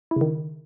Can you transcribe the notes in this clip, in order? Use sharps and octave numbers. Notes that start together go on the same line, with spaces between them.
E4
C#3
D#3